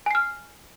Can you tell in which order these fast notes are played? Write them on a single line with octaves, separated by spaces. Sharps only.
G#5 C7 F6